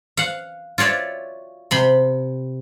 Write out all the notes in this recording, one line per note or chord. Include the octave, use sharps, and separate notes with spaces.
F5 F#5
F4 F#4 C#5 D5 E5
C3 B5 C6